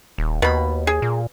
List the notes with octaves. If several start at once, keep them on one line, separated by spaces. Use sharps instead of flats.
D#1
D#2 B2 B5
G#4
A#2